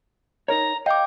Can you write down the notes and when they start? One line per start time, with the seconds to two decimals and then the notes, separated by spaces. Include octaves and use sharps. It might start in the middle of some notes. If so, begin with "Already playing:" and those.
0.48 D#4 A#4 C#5 A#5
0.86 D#5 F5 G5 D6 G6